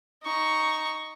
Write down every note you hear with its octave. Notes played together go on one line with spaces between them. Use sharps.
D#4 C#6